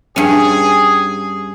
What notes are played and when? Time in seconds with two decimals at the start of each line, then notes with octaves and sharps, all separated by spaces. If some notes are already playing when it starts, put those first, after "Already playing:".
0.16 G2 C#4 G#4